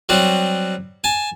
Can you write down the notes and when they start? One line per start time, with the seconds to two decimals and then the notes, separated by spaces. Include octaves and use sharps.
0.09 F#3 G3 C4 F#4
1.04 G#5 A5